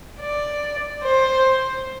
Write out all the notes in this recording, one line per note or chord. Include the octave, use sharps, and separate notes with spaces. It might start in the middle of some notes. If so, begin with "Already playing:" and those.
D5
C5